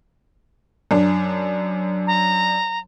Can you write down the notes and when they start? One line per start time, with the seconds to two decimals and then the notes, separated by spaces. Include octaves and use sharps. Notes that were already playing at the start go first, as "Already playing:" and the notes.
0.91 F#2 D4
2.07 A#5